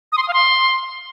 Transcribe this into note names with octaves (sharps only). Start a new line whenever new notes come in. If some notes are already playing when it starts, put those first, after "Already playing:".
D#6
C6
D#6
F5
C6